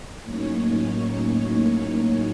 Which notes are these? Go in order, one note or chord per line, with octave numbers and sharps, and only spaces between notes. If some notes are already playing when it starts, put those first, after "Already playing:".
A2 F#3 A#3 C#4 D#4 C#5